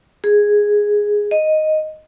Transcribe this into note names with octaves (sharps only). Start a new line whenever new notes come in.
G#4
D#5